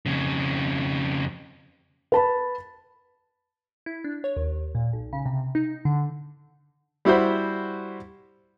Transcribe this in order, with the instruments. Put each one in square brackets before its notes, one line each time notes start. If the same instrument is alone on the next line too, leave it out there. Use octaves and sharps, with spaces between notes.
[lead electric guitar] F2 C#3
[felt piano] B4 A5 B5
[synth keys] E4
D4
C#5
D#2
A#2
B1
C#3
C3
D#4
D3
[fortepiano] G3 E4 F#4 C5 B5